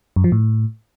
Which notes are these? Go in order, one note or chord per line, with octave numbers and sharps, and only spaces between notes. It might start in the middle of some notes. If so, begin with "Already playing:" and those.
F#2
F3
A2